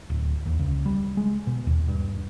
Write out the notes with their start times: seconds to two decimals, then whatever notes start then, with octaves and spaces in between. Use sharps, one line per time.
0.10 D1
0.46 D#2
0.60 C#2
0.86 G3
1.17 G#3
1.47 B2
1.67 D#2
1.89 G2